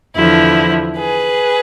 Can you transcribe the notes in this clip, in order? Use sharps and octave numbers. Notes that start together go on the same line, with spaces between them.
E2 D3 F3 E4
G#4 B4